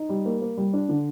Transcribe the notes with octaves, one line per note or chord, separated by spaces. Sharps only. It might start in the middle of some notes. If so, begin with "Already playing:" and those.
Already playing: D#4
G3
A#3
A#3
G3
D4
D3